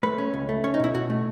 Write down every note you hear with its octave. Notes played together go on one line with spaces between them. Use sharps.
A3 B4
C#4
C#2
A3
C#4 C#5
D#4
B2 E4
B2 F#4
A3